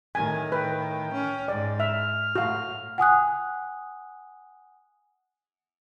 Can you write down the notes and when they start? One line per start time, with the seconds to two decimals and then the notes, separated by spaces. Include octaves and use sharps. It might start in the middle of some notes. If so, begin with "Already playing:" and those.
0.15 A2 D#3 G#5
0.52 B4 G5
1.13 C#4
1.48 G#2 D5
1.80 E5 F6
2.35 A2 F#4 F5
2.98 F#5 G#5 D#6 F#6